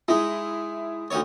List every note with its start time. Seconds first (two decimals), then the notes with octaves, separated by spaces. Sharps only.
0.08 G#3 D#4 E4
1.11 D2 D#4 C#5